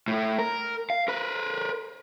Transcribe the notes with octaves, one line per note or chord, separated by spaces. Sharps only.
A2 A3
A#4
F5
A#4 B4